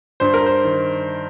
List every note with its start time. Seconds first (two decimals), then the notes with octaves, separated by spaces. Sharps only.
0.20 G2 C5
0.34 A#4
0.46 C5
0.64 D#3